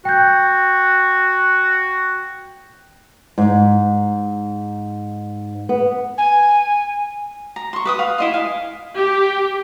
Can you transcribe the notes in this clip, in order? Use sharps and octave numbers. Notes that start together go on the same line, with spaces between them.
F#4 G5 G6
G#2
B3
G#5
A#5
C6 C#6
B4 D6 D#6
F5 F#5
E4 D#5 C6
F5 G#5
G4